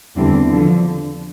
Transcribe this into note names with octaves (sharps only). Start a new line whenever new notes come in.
E2 D3 G3 C4
D3 F3